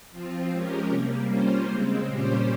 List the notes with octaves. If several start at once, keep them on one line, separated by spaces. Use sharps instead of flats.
F3 C4 F4
F3 G#3 C#4 G4 A#4
C3 G3 A#3
G3 A#3 C#4 F4 C5
C#3 G#3 C4
A#2 G3 C#4 G4 C5